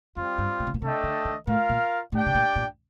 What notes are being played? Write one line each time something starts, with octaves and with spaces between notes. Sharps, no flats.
F2 G3 C4 F4
G2
A#2
C3
A#2
C3 A3 D4 A4 D#5 G5
D3
D#3
A2 F4 A#4 F5
A#2
A2 D4 G4 D5 G5
C3
A#2
A#2